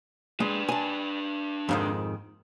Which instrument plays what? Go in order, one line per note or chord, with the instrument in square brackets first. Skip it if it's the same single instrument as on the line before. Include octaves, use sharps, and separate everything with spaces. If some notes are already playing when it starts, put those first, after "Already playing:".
[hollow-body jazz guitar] G#3 [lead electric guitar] D4 B4
[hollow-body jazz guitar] G#5 A5
F2 G#2 D#3